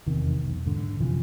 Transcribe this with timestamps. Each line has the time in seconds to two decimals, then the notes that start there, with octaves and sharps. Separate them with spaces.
0.06 F1 E2 C3 D#3
0.44 B1 E2
0.66 G#2 D3
1.00 F#2 C3 E3 F3